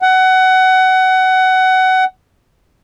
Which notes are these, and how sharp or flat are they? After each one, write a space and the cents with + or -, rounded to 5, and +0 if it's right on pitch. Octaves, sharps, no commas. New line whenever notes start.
F#5 +20